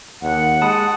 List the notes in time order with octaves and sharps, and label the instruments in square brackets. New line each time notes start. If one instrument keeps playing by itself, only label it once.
[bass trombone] D#2 [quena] F#5
[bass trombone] G#3 [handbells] A5 B5 D#6